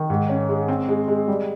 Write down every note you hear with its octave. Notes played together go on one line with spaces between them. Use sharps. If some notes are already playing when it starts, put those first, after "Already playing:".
Already playing: D#3
G#2
C#4
G#3
C4
G#3
G#3
G3